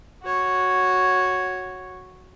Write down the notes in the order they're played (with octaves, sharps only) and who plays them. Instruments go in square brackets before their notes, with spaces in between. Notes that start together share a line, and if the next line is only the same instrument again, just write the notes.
[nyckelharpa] F#4 C#5